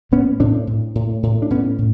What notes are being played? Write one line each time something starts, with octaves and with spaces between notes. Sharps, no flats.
A2 B3 C#4
A2 C4 D4
A2
A2
A2
D4
A2 B3 C#4
A2